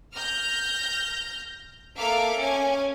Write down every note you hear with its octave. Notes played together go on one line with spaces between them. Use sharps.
F6 G6 A#6
A#3 A4 E5 F5 D6 D7
C#4 G#5